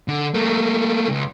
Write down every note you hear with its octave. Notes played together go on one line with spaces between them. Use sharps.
D3
A3 A#3
C#2